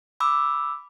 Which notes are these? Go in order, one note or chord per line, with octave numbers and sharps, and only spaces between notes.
B5 D6 E6